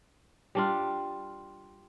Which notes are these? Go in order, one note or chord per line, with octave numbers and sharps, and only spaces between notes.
G3 D4 F4